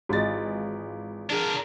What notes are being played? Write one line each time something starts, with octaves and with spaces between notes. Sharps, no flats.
G#1 E3 F4 F#4 G#4 D#5 A6
D4 G#4 A#4 D5